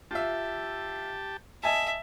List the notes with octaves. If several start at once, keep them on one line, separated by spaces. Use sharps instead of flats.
F4 G4 E5 A5
D#5 E5 G#5 A5